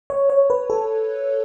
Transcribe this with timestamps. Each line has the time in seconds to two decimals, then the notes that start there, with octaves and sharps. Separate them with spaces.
0.10 C#5
0.30 C#5
0.50 B4
0.70 A4